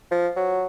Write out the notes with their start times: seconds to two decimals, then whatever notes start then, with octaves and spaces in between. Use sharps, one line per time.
0.11 F3
0.36 F#3